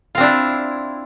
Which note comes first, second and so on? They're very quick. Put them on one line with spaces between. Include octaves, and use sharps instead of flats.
F4 C4 D4 E4